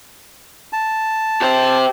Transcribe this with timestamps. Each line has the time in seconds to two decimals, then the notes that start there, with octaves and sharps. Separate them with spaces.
0.73 A5
1.41 G4 C5